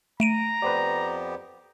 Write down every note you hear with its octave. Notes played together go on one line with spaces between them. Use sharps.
A3 A#5 D7 D#7
F2 B3 G4 B4 C5 D5